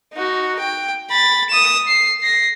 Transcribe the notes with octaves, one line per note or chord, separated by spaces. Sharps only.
D#4 F#4
G5
B5 A6
D#6 E7
C7
A#6 C7